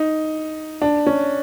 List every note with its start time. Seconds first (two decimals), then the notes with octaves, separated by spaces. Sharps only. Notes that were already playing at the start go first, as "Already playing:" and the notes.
Already playing: D#4
0.82 D4
1.07 C#4